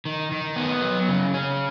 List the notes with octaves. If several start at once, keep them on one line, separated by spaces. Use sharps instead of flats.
D#3
D#3
B3
F#3
C#3
C#4